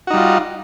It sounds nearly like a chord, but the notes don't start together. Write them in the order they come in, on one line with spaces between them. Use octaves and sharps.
F#4 D#4 G3 F4